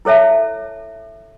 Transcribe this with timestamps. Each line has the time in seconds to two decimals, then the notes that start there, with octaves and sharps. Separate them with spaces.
0.05 E4 A4 C#5 E5 A5